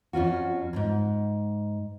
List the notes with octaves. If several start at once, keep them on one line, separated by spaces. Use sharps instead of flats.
F2 C#4 F4 F#4
E2 G#2